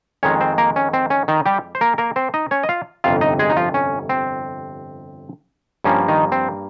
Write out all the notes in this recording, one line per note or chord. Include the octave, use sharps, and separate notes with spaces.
F2 D#3 G#3 C#4 C#5
C4 C5
A#3 A#4
C#4
C4
C#4
D#3 D#4
G3 G4
C5
A#3 A#4
A#3 A#4
C4 C5
D#4 D#5
C#4 C#5
D#5
F4 F5
G1 F2 C3 F4 F5
D#4 D#5
G#3 G#4
D#4
F3 F4
C#4
C4
G2 F3 A#3 C#4
D#3 D#4
C4